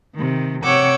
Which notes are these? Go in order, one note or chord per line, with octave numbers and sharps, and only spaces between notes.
C3 D#3
C3 C#5 F#5 G5 D6 E6